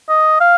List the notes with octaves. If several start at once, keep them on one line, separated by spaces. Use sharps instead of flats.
D#5
F5